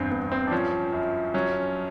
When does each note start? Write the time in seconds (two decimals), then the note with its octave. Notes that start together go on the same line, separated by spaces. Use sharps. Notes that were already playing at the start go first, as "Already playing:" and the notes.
Already playing: E2 G2 C4
0.11 G2 B3
0.32 C4
0.47 D4
0.51 F3 C#4
0.93 F#2
1.34 F#3 C#4